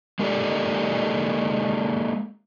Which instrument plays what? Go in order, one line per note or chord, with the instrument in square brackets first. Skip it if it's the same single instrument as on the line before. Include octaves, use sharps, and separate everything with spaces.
[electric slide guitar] G#3 A#3 D#4 G4 A4 D5